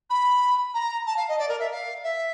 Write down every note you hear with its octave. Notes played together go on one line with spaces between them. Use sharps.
B5
A#5
A5
F5
D#5
D5
A#4
E5
F5
E5